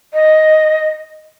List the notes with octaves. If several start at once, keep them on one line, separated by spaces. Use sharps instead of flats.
D#5